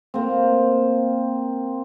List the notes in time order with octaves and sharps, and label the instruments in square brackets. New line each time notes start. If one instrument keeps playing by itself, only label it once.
[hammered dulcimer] A#3 C4